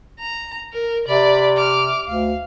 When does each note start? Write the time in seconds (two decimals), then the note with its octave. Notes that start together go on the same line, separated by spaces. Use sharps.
0.19 A#5
0.73 A#4
1.08 C3 D5 B5
1.57 D6 F6
2.07 D2 F5